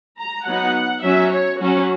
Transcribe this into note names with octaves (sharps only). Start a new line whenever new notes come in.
A#5
F#3 B3 D#4 F#5
F#3 C#4 E5
C#5
F#3 C#4 F#4